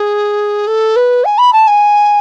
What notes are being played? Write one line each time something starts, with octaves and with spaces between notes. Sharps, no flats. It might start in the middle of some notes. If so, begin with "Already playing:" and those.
Already playing: G#4
A4
B4
G#5
B5
A5
G#5